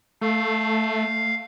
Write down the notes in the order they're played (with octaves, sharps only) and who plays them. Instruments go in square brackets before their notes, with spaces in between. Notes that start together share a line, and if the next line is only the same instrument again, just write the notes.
[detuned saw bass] A3 [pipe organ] F5